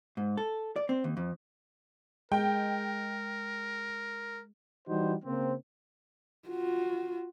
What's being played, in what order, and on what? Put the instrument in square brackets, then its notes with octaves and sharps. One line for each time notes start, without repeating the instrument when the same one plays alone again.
[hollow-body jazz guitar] G#2
A4
D5
C4
D#2
F2
[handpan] G#3 [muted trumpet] A#4 [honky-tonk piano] G5
[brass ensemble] E3 G3 D#4 F#4 C5
C#3 A#3 C4
[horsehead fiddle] F4 F#4